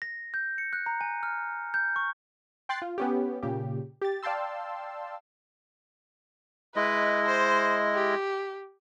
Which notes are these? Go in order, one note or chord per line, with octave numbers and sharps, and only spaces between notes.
A#6
G6
C#7
F#6
A#5
G#5
F6
G6
C#6
G5 C6 F#6 A6 C7
F4
B3 C#4 G4
A#2 C#3 G4
G4 A6
D5 F5 G5 A5 C6 E6
G#3 E4 B4 D#5
C5
G4